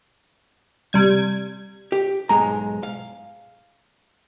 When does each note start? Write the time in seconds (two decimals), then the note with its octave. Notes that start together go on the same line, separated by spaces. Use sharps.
0.93 C3 G3 G#6
1.92 G4
2.29 B1 G#2 G#3 A#5
2.83 F5